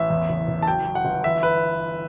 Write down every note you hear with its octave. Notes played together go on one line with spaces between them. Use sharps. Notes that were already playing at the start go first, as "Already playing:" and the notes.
Already playing: A1 E5
E2
F#1
F#1
A5
F#3 G5
F#3
F#5
G1
E3 E5
B4